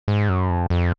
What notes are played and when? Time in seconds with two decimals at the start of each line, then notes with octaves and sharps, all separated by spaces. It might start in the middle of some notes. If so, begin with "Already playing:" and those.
0.08 G#2
0.29 F#2
0.50 F2
0.70 F2